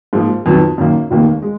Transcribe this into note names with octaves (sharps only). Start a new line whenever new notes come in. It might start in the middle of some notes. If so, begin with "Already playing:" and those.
G#2 F3 A#3
F2 D#3 F#3 B3
F#2 D#3 A#3
F1 D#2 D#3 A#3
G#3